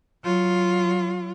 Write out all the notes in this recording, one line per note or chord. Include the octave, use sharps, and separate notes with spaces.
F#3 F4